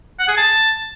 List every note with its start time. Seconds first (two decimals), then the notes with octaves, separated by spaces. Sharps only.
0.19 F#5
0.28 G#4
0.37 A5